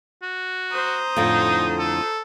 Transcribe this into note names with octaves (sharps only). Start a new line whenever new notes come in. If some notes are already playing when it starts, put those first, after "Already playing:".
F#4
C5 A#5 D#6
F2 A2 D3 D#4
A4